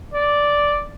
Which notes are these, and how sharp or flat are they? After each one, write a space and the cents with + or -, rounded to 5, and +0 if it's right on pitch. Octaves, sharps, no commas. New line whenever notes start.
D5 -5